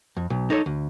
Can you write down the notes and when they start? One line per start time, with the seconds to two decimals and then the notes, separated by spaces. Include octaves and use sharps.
0.17 F2
0.30 B1
0.50 D#4 A4 C#5
0.66 D2